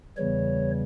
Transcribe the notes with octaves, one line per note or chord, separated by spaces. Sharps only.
E2 C#3 E3 G3 C#5